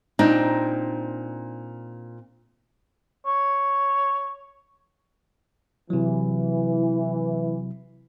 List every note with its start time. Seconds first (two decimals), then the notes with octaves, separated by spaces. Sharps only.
0.19 A#2 C4 D4 D#4
3.26 C#5
5.90 C3 E3 F#3